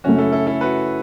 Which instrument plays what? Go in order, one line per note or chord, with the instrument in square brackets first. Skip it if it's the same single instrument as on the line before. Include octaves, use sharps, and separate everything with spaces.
[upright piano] F#2 C#3 A3 [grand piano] C#4 F#4
[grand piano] E4 A4
E4 A4
E4 A4
F#4 B4